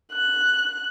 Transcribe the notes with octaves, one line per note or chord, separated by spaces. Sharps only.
F#6